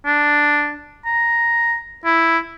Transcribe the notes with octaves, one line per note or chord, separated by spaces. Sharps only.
D4
A#5
E4